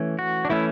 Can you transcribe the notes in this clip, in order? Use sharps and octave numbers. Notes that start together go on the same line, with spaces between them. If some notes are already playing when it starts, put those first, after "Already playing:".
Already playing: E3 A3 C#4
F#4
D4
E3 A3 C#4 E4